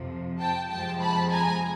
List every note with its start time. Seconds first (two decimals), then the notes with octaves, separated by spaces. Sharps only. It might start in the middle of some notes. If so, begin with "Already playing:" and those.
Already playing: F2 C3 F3
0.39 G5 A5
0.70 F2 C3 F3 G#3 G5 A5
1.01 A5 B5
1.31 G#5 A#5